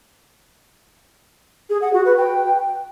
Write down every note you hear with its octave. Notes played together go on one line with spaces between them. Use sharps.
G#4
F#5
F#4
B4
G5